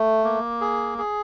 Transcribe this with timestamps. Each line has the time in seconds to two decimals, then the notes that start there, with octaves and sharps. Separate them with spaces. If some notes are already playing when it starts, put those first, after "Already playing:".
Already playing: A3
0.24 A#3
0.61 G#4
0.98 G#4